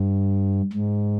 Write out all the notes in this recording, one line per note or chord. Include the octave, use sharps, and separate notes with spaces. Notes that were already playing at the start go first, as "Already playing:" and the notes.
Already playing: G2
G#2